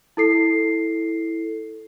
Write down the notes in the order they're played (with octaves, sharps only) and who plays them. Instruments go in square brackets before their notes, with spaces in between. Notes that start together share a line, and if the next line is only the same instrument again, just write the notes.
[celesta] E4 A4 C7